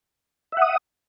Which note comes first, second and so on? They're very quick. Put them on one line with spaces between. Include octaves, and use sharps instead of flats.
E5 F#5 D#6